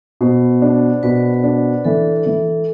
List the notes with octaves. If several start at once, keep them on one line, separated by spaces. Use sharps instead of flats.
B2 C5
D4
B2 B4
D4
E3 A4
E3